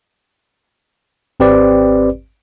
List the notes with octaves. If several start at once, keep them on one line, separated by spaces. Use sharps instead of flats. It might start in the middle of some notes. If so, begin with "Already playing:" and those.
G#1 C4 G4 B4 D5